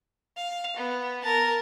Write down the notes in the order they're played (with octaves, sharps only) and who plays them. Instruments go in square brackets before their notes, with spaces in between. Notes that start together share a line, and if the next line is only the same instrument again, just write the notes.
[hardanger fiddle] F5
B3
A#4 A5